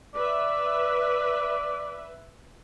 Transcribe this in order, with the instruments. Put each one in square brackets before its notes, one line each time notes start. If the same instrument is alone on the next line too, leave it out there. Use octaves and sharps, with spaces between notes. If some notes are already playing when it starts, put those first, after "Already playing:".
[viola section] B4 E5 [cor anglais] D5